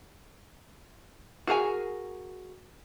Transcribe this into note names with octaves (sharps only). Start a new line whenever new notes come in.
F#4 G#4 A#4 G#5